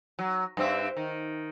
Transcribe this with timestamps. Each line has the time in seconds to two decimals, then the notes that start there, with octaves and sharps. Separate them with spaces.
0.19 F#3
0.57 G2 C4 E5
0.97 D#3